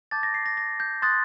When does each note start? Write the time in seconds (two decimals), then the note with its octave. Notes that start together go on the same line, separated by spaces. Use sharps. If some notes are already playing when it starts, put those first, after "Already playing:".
0.11 A5 D6 G6 A6
0.23 A#6
0.34 C7
0.46 A#6
0.57 A#6
0.80 G6
1.02 C6 D#6 F#6 A6